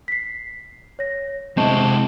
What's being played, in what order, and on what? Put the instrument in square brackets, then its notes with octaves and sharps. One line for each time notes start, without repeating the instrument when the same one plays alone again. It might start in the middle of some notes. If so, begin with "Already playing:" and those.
[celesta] B6 C7
C#5 A#6
[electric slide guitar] C3 C4 [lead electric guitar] G#3 E4 [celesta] D#5 A5 C#6